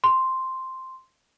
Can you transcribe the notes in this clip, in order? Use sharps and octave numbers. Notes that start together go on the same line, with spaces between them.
C6